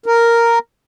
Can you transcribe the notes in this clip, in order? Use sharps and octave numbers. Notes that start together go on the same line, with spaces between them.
A#4